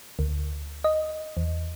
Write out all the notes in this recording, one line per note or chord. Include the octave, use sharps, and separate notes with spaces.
D2
D#5
E2